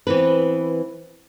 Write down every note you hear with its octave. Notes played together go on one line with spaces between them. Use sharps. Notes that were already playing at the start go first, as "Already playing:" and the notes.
E3 B3 C4 B4